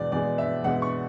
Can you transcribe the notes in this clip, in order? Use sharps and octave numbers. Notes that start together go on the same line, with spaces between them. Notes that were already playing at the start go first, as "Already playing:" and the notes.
Already playing: E2 B2 G#3 D5
E2 B2 G#3 D5
E5
E2 B2 G#3 F#5
C#6